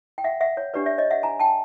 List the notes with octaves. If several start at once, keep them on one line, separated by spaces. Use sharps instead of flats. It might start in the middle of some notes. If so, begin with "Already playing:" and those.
G5
E5 F#5
E5 F#5
C#5
D4 G4 B4 D5
D5 E5
C#5 D#5
E5 F#5
G#5 A#5
G5 A5